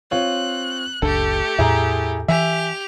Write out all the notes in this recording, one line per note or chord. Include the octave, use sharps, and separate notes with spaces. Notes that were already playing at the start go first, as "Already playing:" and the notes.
C4 F4 C#5 F#6
F#1 C#2 A3 D4 G4 A4
E2 A2 E4 G#4 A#5
E3 G4 E5 G#5 F7